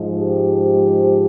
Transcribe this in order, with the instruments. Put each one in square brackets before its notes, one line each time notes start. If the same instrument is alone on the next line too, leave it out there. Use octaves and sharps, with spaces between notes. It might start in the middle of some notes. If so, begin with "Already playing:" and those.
Already playing: [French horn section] G#2 F3 G#3
G4